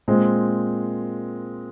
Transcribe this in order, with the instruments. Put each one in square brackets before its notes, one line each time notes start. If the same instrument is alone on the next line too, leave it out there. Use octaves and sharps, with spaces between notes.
[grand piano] A#2 G#3 C4